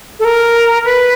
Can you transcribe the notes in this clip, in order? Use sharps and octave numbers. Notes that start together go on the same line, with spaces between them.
A4
A#4
B4